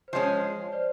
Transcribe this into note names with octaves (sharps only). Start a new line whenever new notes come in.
C5
F3 G#3 C#4 C#5
C#5
C5 D5